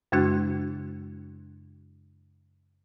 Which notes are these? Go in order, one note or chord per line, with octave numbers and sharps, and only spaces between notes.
F#2 C#3 G#3 D4 F#4 F#6